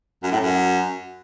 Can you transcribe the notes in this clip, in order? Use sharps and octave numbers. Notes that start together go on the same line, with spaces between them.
F#2
A2
F#2